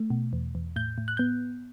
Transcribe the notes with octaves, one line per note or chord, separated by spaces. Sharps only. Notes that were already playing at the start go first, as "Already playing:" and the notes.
Already playing: A3
B2
E2
E2
A2 G6
A2
F#6
B3 G6